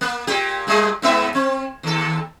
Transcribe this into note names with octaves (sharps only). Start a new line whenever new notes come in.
A#3
A#2 G4
A#2 G3 G#3
G#2 B3 E5
C4
D#2 A4